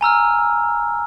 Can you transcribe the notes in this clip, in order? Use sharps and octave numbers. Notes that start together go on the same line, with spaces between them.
G#5 A#5 E6 F6